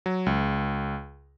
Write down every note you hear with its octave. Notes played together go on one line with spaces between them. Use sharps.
F#3
C#2